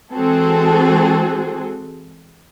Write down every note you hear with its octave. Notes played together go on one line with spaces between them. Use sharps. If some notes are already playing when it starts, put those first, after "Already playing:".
E3 G#3 C4 F#4 G#4 A4